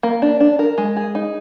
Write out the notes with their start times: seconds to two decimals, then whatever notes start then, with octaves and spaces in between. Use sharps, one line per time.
0.03 A#3
0.22 D4
0.40 D4
0.59 A#4
0.78 G#3
0.97 G#4
1.15 D#4